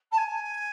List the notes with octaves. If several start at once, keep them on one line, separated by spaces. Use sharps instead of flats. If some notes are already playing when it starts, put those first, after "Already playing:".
A5
G#5